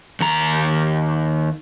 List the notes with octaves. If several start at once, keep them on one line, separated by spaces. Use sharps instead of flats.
D#2 A#5